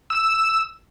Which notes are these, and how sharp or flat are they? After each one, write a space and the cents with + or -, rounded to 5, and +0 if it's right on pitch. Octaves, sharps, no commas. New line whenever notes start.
E6 +0